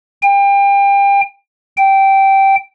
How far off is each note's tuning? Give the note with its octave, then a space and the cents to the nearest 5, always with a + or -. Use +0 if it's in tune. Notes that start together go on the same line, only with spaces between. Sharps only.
G5 +30
G5 -10